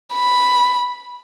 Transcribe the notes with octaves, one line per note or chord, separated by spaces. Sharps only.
B5